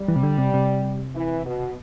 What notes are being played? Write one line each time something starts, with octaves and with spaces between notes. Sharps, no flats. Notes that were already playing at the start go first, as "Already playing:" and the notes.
Already playing: G3
E3
C3
D3
C3
C3
E3
B2